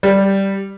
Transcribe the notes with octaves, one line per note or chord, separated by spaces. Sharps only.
G3